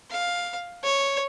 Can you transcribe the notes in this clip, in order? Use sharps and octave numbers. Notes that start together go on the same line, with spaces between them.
F5
C#5